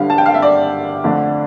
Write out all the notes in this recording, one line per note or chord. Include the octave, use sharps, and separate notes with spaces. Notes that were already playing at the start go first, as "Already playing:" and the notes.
Already playing: G1 G2 D3 G3 F5
A5
G5
F5
E5
D5
F2 D3 A3 D4